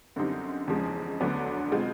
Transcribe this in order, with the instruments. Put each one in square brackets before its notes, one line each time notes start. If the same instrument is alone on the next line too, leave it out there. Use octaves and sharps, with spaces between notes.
[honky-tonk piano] F#2 D3 G3 C4 D#4
E2 C#3 F3 G#3
D2 D3 F#3 B3 D4
B2 G#3 C4 F4